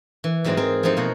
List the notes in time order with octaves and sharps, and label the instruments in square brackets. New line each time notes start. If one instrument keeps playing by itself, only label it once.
[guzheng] E3
G#2 F#3 G#3 C4 E4 D#5
C4 G#4 A#4
F3 G#3 A3 C4 D#4
B2 A#3 A#4 F#5